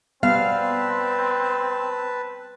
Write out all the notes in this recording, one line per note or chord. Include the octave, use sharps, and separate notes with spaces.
G3 B3 C4 B4 F5 A5